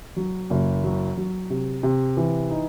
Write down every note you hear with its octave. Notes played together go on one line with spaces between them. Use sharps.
F#3
F#1
F#3
F#3
C3
C3
E3
D#4